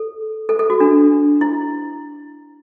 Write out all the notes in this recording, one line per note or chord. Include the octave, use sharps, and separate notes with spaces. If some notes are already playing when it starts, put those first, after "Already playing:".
Already playing: A4
A4
A4
F#4
D4
E4